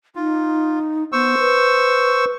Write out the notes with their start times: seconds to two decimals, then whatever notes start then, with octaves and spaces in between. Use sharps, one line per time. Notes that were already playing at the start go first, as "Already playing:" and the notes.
0.16 D#4 F4
1.12 B3 C5 C#6 E6
1.38 B4